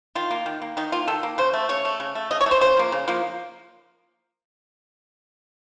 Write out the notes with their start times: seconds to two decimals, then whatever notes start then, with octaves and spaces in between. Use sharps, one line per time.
0.15 D#3 F4
0.31 A#3
0.46 D#3
0.62 A#3
0.77 D#3 D#4
0.92 A#3 F4
1.07 D#3 A4
1.23 A#3
1.38 C#3 C5
1.53 A3
1.69 C#3 C#5
1.85 A3
2.00 C#3
2.15 A3
2.31 C#3 D#5
2.41 C#5
2.46 A3
2.51 C5
2.61 C#3 C5
2.77 F3 A#3
2.92 C#3
3.08 F3 A#3